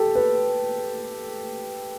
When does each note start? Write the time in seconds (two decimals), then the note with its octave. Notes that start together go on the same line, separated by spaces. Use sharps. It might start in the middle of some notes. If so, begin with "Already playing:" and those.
Already playing: G4 A4
0.15 B4